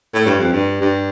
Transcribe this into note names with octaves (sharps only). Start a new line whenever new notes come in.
A2
G2
F2
G2
G2